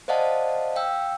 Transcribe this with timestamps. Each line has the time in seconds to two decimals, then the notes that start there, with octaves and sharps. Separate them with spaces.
0.08 C5 D5 D#5 F5 F#5 A5
0.76 F5 G5 E6